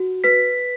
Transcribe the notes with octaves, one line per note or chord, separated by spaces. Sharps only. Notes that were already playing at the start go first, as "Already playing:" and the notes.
Already playing: F#4
B4 B6